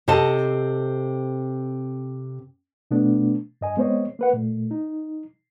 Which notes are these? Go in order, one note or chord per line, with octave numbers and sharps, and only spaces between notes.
C3 C4 A4 D#5 A5
B2 A3 B3 D4
G2 D#5 G#5
G#3 B3 C4 C5 C#5 D#5
A#3 B4 F#5
A#2 A3
D#4